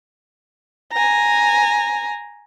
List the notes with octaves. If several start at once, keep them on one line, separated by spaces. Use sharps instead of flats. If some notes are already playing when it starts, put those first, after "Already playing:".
G#5 A#5